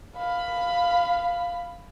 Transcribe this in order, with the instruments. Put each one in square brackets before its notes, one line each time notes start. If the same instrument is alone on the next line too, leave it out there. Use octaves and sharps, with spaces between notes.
[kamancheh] F5 B5